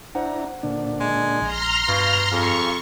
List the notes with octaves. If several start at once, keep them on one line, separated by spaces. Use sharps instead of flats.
D4 E4 C5 F#5 A#5
A#2 D3 D4
G#3
A#1 A#5 C6 F6
G2 B2 F5
F2 G#4 F5 C#6